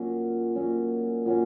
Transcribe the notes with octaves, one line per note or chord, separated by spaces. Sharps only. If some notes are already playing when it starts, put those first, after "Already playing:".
Already playing: A#2 F#3 C#4
A#2 F#3 C#4
A#2 F#3 C#4